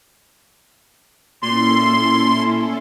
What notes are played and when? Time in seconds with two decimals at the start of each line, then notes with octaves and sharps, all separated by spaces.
1.43 A#2 C#4 E4 A4 C6